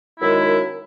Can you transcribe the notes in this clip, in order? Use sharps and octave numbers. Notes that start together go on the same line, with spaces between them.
F#2 D#3 G#3 E4